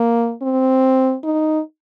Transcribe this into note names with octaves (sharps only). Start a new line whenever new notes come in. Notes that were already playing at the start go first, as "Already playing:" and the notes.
Already playing: A#3
C4
D#4